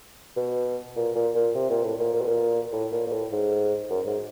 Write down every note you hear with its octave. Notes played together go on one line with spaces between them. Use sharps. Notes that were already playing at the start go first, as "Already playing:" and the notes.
B2
A#2
A#2
A#2
C3
A#2
A2
A#2
A#2
B2
A#2
A2
A#2
A#2
A2
G#2
F#2
G#2